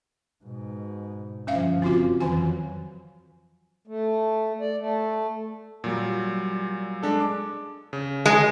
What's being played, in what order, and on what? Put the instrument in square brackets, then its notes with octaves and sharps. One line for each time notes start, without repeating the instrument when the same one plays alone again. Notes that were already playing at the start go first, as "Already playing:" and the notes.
[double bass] G#2 B2
[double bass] G1 F3 [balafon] C#4 E5 F5
[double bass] F#1 [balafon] C4 F4 F#4
[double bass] F2 F#3 [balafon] D#3 E3 G#5
[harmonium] A3
D5
A3
[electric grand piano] A#2 F#3 G3
G#3 D4 A4
D6
C#3
[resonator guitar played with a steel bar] G#3